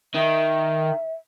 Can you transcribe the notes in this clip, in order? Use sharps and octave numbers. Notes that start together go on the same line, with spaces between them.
D#3 E5